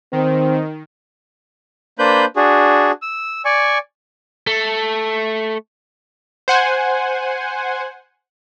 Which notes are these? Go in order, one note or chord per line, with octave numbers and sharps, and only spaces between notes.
D#3 C4
A#3 D4 B4 C5 B5 G6
D4 F#4 G#4
E6
D5 G#5 C#6
A3
C5 F#5 G#5